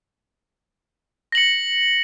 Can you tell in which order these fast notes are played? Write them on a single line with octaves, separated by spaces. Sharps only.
A#6 F#7 C#7